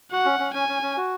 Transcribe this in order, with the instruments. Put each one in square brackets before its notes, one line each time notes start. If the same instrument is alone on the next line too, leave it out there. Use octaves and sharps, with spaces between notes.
[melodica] F#4 [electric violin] F#5
[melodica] C#4
C#4
[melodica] C#4 [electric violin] G#5
[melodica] C#4
C#4
F#4